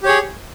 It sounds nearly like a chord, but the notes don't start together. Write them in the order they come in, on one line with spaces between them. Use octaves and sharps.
G4 C#5 G#4